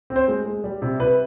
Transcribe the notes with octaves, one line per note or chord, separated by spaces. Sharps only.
C4
C5
G#3
G#3
G3
C3
C3 B4